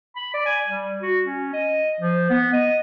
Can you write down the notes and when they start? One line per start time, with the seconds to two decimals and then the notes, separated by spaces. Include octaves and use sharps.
0.16 B5
0.34 D5
0.46 G#5
0.67 G3
1.02 F#4
1.25 C#4
1.53 D#5
2.00 F3
2.30 B3
2.53 D#5